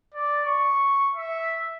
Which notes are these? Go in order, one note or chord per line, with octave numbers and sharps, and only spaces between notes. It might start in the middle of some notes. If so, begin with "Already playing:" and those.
D5
C#6
E5